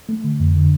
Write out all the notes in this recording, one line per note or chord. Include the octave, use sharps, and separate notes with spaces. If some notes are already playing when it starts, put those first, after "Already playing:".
A3
D3
F2
D3